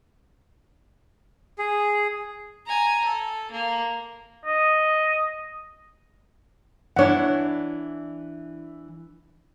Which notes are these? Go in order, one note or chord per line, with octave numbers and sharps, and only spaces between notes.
G#4
G#5 A#5
A4
A#3
D#5
E3 D4 E4 C#5 F#5